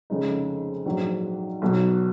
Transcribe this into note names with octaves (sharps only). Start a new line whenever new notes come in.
F1 F2 C#3 G#3 D#4
A#1 G#2 F#3
B1 B2 F#3